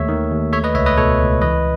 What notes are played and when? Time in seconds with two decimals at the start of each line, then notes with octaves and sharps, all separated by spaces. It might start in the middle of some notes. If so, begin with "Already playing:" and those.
Already playing: D#2 A3 C#5 E5
0.09 D#3
0.31 D#2
0.53 A3 C#5 E5
0.64 B4 D#5
0.75 C#2 C#5 E5
0.86 B4 D#5
0.97 B2 A4 C#5
1.20 C#2
1.41 E3 B4 D#5